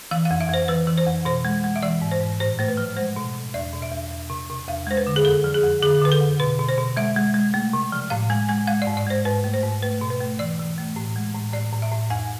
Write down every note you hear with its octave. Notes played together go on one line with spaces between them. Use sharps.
E3 F5
F5
F2
E5
F2 C5
E3 B4
E3
C5
F2
B2 C5
G#3
G#3
E5
E3 D5
G#2
C5
G#2
A2 C5
A3 C5
B4
F3
G#3 C5
B2
B2
E2 D5
B2
E5
E2
E2
C3
C3
E2 F5
G#3 C5
B4
D3
G#4
F2 A4
F3
G#4
F2
D3 G#4
D3 B4
A4
F2
B2 B4
B2
C5
B2
G#3 E5
G#3
G#3
A3
C3
F3
A2 F5
G#3 G#5
G#3 G#5
G#3 F5
D5
G#2
D5
G#3 C5
G#2 B4
A3
C5
G#2
A3 B4
B2
B4
A3
E3 D5
E3
A3
A2
G#3
A2
A2 D5
A2
E5
A2
F2 G#5